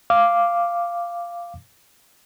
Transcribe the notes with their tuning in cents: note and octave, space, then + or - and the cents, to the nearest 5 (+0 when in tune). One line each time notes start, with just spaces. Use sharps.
F5 -10 D6 +0